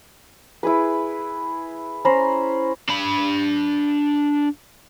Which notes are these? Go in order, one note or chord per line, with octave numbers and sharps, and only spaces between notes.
E4 G#4 B4
C#4 C5 A#5 B5
D4 B5